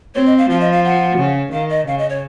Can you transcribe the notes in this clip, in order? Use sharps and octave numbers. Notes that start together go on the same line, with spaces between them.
C4 C#5
D#5
F5
F3 F5
D#5
F5
F#5
C#3
D#3 F5
D#5
C#3 F5
D#5
C#5